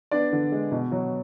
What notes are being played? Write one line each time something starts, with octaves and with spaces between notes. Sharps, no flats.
B3 D4 D5
D3
G#3
B2
F#3